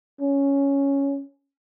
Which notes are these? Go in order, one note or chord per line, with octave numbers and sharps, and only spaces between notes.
C#4